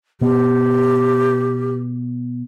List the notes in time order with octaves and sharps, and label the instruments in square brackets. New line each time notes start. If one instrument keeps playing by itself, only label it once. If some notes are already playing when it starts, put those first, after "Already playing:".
[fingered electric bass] B2 B3 [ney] G4